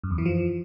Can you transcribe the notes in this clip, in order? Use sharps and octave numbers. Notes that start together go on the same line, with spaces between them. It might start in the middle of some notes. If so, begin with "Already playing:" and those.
F#2
E2
E3
F3